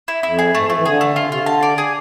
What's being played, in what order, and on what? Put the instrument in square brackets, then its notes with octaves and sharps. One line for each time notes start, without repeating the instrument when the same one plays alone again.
[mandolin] E4
[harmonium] F2 [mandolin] E4
[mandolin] G#4
[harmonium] G#2 [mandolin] A3
[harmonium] F3
[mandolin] A3
[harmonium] E3
[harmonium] D3 [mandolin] G#4
[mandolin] A3
[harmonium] D3 [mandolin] F4
[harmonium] C3 [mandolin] F4
[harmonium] D3
[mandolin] A5
D5
G#4